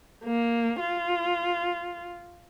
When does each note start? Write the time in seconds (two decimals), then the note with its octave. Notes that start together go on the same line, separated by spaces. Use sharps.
0.24 A#3
0.80 F4